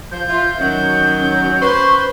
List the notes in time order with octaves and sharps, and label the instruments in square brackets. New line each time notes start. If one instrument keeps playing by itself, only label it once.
[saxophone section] F3 [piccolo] G6
[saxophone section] F4 [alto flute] E5
[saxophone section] D#3 F#3 [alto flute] C#4
[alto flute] C#4
[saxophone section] C#4 B4 C5 [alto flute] C#6